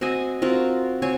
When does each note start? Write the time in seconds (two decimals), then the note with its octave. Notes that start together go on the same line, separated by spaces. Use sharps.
0.01 C4 F#4 D#5 G#5
0.42 C4 F4 F#4 A#4
1.02 C4 F#4 C#5 G#5